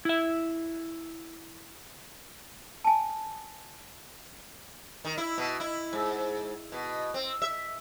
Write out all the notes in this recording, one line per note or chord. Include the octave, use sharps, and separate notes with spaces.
E4 E5
G#5 A5
D#3
E4
B2
E4
G#2
B2
C4
E5